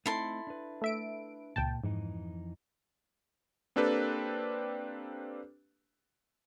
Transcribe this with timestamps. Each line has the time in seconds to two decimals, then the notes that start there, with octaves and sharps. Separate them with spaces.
0.06 A3 C4 D#4 E4 A4 C6
0.47 D4 B4
0.82 A3 E5 D7
1.56 C#2 A#2 G5 A5
1.84 F2 G#2 E3 D#4
3.76 A#3 C4 D4 G4 A4 B4